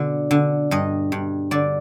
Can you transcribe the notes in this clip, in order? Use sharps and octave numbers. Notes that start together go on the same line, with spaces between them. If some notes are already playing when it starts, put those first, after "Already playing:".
Already playing: B2 D3 D5
D3
G2 D#5
G2
D3 D5